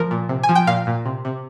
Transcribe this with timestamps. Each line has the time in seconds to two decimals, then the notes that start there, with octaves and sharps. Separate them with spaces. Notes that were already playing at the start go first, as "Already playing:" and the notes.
Already playing: F3 A#4
0.11 A#2
0.29 C3
0.43 G#5
0.49 F3
0.55 G5
0.67 A#2 F5
0.87 A#2
1.06 C3
1.25 C3